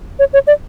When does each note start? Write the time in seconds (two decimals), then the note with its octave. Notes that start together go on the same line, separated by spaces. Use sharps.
0.19 C#5
0.33 C#5
0.47 D5